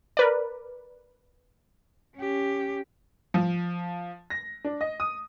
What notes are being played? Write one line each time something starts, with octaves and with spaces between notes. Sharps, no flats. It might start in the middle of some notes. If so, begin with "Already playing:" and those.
A#4 B4 D5
C#4 G4
F3
A#6
D4
D#5
D#6